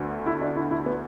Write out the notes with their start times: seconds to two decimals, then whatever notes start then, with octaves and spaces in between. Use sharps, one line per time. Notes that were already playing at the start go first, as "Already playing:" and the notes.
Already playing: D2 D3 B3 F#4
0.26 E4
0.41 D4
0.56 E4
0.71 E4
0.86 B3